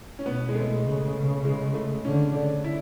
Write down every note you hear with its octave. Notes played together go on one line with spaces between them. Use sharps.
C#4
B2 B3
G#3
A3
C#3
G#3
A3
D3 C#4
D4
E4